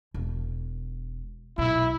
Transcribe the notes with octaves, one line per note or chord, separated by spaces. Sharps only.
E1
B1 A#2 E4